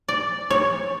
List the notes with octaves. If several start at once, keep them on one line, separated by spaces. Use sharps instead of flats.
D5
C#5